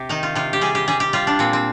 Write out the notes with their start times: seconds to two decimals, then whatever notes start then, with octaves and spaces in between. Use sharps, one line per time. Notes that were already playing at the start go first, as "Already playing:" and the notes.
Already playing: C3 G4
0.09 D#3 D#4
0.23 F4
0.35 C3 F4
0.53 G4
0.61 G3 G#4
0.75 G4
0.88 G3 G#4
1.00 G4
1.13 G3 F4
1.27 D4
1.39 A#2 C4
1.53 C4